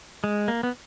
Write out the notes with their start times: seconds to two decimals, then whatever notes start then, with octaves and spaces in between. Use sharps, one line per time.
0.24 G#3
0.48 A#3
0.63 B3